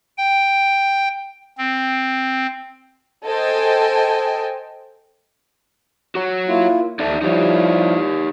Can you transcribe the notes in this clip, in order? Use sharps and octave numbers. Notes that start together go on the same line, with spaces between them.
G5
C4
A4 C5 D#5 G5 G#5
F#4 C#5
A#3 E4 F4
D#2 D#4 A4 D5 E5
F3 G3 D#4 E4 G4 C#5